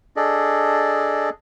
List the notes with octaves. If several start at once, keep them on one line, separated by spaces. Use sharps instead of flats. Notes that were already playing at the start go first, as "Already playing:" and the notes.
D4 G#4 A4 D5 D#5